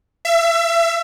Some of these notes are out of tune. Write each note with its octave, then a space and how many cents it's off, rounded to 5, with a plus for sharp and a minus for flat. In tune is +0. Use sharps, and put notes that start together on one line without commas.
E5 +30